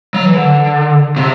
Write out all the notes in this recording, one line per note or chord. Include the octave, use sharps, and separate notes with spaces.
F#3
E3
D3
C3